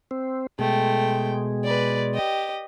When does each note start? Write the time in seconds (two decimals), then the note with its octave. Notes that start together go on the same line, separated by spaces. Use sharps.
0.11 C4
0.59 B2 G#3 A3 G5
1.64 B4 D5
2.15 G4 D#5